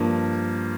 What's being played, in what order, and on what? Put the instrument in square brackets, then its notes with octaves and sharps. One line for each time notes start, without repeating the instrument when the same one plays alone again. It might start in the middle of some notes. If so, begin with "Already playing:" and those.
Already playing: [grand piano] G2 F3 A#3